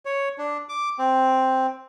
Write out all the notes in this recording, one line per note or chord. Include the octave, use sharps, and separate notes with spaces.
C#5
D4
D6
C4